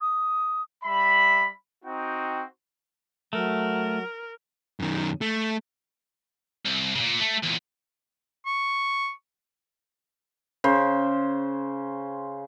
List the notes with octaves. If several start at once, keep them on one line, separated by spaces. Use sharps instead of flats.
D#6
G3 E5 B5
C4 D#4 F#4 G5
F#3 A3 A#4
F#2 D#3
A3
C2
A#2 C#3
A3
E2 A#2
C#6
C#3 C5